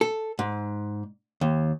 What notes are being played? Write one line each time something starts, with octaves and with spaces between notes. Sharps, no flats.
A4
G#2
D#2